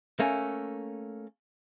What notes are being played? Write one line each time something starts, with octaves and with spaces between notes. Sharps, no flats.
A3 A#3 C#4